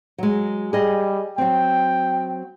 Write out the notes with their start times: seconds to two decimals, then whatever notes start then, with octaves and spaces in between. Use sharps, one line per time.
0.18 F#3 G#3
0.73 G3 G#4 D#5
1.38 F#3 C4 G5